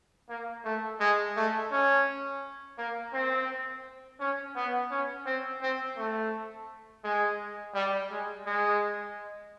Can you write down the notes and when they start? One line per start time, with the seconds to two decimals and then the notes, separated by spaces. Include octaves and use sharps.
0.29 A#3
0.65 A3
1.00 G#3
1.36 A3
1.72 C#4
2.78 A#3
3.13 C4
4.20 C#4
4.55 B3
4.91 C#4
5.26 C4
5.62 C4
5.97 A3
7.04 G#3
7.75 G3
8.10 G#3
8.46 G#3